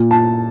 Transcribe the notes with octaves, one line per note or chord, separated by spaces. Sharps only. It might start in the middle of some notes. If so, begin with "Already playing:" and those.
Already playing: A#2
A5